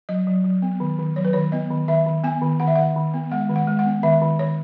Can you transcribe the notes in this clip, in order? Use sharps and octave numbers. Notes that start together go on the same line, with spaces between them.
F#3 D#5
F#3
F#3
B3
D#3
D#3
F#3 C#5
B4
D#3 C#5
B3 D#5
D#3
D#3 E5
D#3
B3 G#5
D#3
D#3 F#5
E5
D#3 F#5
D#3
B3
G#3 F#5
D#3
F#5
G#3
F#5
B3
D#3 E5
D#3
D#3 C#5